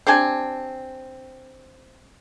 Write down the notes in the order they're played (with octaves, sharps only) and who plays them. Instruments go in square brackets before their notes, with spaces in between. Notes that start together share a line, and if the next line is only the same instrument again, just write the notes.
[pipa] C4 D4 G4 G#5